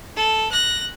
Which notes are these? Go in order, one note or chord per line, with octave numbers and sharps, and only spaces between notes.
A4
F#6 A#6